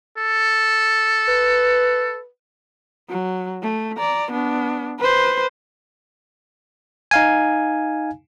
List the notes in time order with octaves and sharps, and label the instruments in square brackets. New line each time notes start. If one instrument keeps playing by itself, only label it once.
[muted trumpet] A4
[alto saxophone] B4
[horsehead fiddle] F#3
A3
D5 A#5
B3 D4
B4 C5
[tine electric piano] D#4 F5 G#5